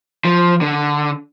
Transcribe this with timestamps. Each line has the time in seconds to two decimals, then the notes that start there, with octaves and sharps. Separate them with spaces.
0.25 F3
0.61 D3